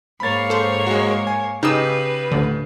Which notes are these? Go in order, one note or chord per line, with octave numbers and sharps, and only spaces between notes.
G#2 A#3 C#5 B5 A6
A4 C5
G#3 F#4
G#5
C#3 D#4 G4 B4 D#6 E6
D2 A2 D3